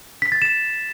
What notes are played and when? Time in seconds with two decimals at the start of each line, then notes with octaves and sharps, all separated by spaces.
0.22 B6
0.32 A6
0.42 E7